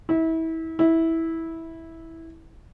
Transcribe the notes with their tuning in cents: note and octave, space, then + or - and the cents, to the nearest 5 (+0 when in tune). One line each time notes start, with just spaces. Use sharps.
E4 -30
E4 -15